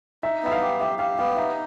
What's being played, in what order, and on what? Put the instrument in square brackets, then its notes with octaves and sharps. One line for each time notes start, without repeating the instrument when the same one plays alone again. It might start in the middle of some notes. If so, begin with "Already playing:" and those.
[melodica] D#4 [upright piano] E5
[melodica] B3 [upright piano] E5
[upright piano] F5
[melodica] G4
[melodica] G4 [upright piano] E5
[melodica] G4 [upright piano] F5
[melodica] B3 [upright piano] F5
[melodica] D#4 [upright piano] E5